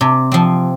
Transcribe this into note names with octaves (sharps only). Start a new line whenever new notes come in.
C3
F3 C4